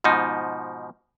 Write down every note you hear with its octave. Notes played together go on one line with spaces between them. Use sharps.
G#2 B2 F3 D#4